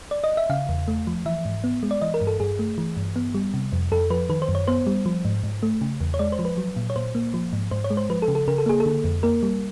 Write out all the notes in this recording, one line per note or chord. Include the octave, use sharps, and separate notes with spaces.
D5
D#5
E5
C#3 F5
E2
A3
F3
E3 E5
G#2
B3
G#3
D5
E3 D#5
A#4
G2
A4
G2 G#4
A3
E3
G2
B3
G3
C3
F2
F2 A4
F3 B4
D#3 B4
C5
F#2
C#5
B3 C5
G3
F3
G#2
G#2
A3
C#3
E2
C#5
G#3 D5
C5
F3
B4
F#3
A#2
C#5
A#2 C5
A#3
F3
G#2
G#2 C5
C#5
G#3
C5
F3 B4
A4
C#3
A4
C#3 A#4
A4
A#3 G#4
A4
D3
F2
A#3 A#4
G3